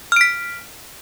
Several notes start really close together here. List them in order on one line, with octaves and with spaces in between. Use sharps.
F6 D7 B6